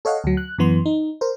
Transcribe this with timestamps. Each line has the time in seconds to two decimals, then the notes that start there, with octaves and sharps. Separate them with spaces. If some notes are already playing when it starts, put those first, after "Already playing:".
0.05 A4 C#5 D#5 F5 F#5
0.24 D2 F#3
0.37 F#6
0.58 F#2 E3 B3 C6
0.86 D#4
1.21 A#4 C5